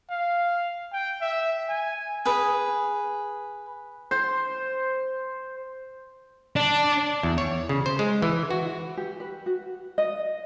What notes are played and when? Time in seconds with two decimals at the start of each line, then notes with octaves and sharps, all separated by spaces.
0.10 F5
0.93 G5
1.21 E5
1.69 G#5
2.25 G#4 B4
4.11 C5
6.56 D4
7.23 E2
7.38 C#5
7.69 C#3
7.86 C5
7.99 G#3
8.22 E3
8.50 F#4
8.97 G4
9.20 B4
9.46 F#4
9.98 D#5